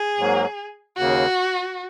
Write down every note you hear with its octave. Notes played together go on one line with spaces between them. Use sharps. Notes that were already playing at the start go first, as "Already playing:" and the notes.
Already playing: G#4
G#2 F#3 A#3
D#2 C#3 A#3 F#4